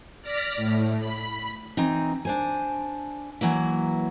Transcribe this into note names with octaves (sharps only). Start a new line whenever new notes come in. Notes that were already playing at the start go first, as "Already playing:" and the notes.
D5 F6 A#6 B6
A2
B5
E3 C4 D#4
D4 C5 G#5
E3 F#3 A#3 E4